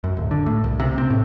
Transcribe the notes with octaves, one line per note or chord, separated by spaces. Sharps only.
F#2
D1
D3
A2
C2
C3
C4
A2